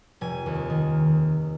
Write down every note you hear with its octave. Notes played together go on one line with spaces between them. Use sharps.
F1 G#5
D#2
D#3